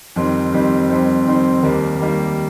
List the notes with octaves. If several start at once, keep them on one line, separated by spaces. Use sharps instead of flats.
F2 D#3 G3 C4
F2 D#3 G3 C4
F2 D#3 G3 C4
F2 D#3 G3 C4
D#2 D#3 G3 A#3
D#2 D#3 G3 A#3